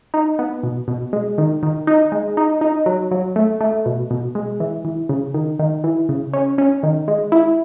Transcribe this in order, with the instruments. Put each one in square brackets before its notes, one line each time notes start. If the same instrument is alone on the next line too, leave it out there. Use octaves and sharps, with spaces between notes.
[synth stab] D#4
B3
B2
B2
G#3
D#3
D#3
D#4
G#3
D#4
D#4
F#3
F#3
A3
A3
B2
B2
G#3
E3
E3
C#3
D#3
D#3
E3
C#3
C#4
C#4
D#3
G#3
E4